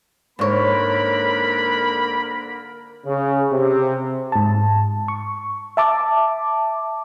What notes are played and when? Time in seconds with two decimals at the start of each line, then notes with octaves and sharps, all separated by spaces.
0.39 G#2 D3 A#3 A#4 C#5 B5
3.06 C#3
3.52 C3
4.32 G#2 A5
5.08 C#6
5.77 E5 A5 D6